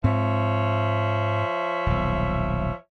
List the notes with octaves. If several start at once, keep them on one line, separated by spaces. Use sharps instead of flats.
G#2 F3 C4 C#5 E5
D#1 B1